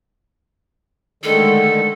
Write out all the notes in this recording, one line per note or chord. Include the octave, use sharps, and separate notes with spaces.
D3 D#3 G#3 A3 A4